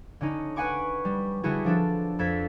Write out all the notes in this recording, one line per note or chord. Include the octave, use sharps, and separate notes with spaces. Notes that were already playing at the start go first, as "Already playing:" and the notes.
D3 C#4 D#4
B4 F#5 G#5 C#6 D6
G3
D3 G3 E4 F#4 G#4
F3 D4 A4
F2 A4 G#6 B6